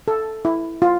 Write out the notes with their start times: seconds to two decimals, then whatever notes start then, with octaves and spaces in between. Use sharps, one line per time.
0.08 A4
0.45 E4
0.82 F4